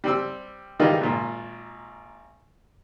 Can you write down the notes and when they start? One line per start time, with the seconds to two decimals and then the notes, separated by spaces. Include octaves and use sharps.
0.04 G3 C4 E6
0.79 D#3 E3 G3 G#3 D#4 F4
1.01 G#1 A#2